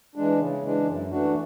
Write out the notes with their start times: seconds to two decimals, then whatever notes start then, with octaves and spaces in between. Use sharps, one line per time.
0.15 E3 G#3 D4
0.39 C#3
0.63 E3 G#3 D4
0.87 F#2
1.11 E3 A3 D4 F#4